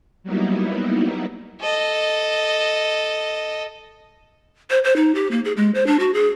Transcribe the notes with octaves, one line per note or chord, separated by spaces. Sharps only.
F#3 G3 A#3 B3 D#4 E4
A4 D#5
C5
C5
D#4
G4
A#3
G#4
G#3
C5
D4
F#4
G#4